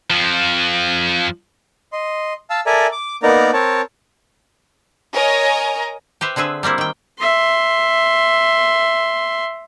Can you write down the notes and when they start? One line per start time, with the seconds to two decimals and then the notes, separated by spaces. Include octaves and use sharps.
0.10 F2 F3
1.93 D#5 C6
2.50 F5 A5 E6
2.66 A4 A#4 D5 E5 G#5 A#5
2.92 D6
3.23 A#3 B3 D#4 A#4 D5 A#5
3.53 C4 A#4 C#5 A5
5.13 A#4 C#5 D#5 G#5 A#5
6.21 G4 B4 C5 E5
6.36 D3 C4 G#4 B4 E5
6.63 G3 A#3 C4 E4
6.78 D#3 G5
7.19 E5 C6